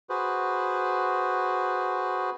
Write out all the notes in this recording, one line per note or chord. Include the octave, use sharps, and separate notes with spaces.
F#4 G#4 B4 C5